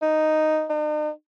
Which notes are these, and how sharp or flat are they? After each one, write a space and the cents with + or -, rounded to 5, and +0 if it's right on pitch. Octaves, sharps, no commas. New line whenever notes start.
D#4 -5
D#4 -45